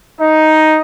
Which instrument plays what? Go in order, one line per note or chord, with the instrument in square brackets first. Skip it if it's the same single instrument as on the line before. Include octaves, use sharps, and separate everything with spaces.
[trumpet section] D#4 D#5